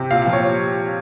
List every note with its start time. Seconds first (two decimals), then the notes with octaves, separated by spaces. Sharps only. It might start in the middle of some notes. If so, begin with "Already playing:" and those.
Already playing: C3
0.11 A#2 F5
0.22 F5
0.27 F3
0.33 C#5